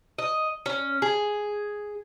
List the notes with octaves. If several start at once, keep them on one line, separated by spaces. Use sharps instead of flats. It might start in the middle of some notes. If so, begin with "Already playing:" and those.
D#5
C#4
G#4